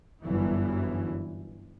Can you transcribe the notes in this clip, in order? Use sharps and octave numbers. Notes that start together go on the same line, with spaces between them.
G1 F#2 E3